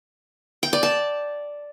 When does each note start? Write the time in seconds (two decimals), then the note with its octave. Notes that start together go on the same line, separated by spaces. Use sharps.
0.63 G5
0.73 D5
0.83 A5